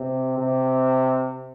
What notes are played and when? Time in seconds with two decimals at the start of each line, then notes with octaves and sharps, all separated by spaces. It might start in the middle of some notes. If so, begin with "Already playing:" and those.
Already playing: C3
0.38 C3